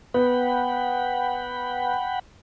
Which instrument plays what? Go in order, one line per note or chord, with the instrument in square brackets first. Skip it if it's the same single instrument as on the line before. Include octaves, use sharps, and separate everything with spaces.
[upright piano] B3 [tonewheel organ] F#5 G5 B5